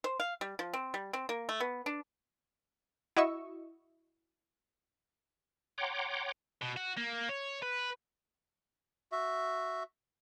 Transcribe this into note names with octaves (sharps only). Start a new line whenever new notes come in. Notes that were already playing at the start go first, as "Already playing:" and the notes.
C5
F5
G3
F3
C4
G3
C4
A#3
A3
B3
D4
E4 F#4 D#5 C#6 E6
C#5 F#5 G5 A#5 C6 D6
B2
F#4
A#3
C#5
B4
F#4 E5